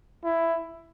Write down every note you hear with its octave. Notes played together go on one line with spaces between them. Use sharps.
E4